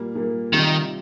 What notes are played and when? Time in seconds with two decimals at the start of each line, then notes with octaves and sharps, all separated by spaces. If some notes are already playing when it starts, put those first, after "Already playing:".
Already playing: A#2 G3 A#3
0.15 A#2 G3 A#3
0.53 C3 D#3 G3 C4 F4